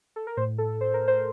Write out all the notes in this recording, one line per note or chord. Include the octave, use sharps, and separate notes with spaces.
A4
A#4
A2 C5
A4
C5
A#4
C5